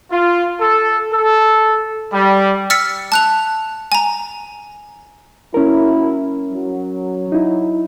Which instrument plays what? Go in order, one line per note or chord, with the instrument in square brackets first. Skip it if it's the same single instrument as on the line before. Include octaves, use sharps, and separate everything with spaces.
[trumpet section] F4
A4
A4
G3
[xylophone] E6 F6 A6 B6 C#7
A5 F#6 F7
G#5 A#5
[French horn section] F#3 A#3 E4 [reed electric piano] C#4 A#4
[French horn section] F#3
[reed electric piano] D#4 E4